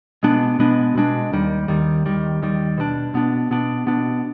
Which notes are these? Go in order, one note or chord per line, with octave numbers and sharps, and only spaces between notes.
B2 G#3 B3 D4
B2 G#3 B3 D4
B2 G#3 B3 D4
D#2 D#3 G3
D#2 D#3 G3
D#2 D#3 G3
D#2 D#3 G3
B2 B3 D4
B2 B3 D4
B2 B3 D4
B2 B3 D4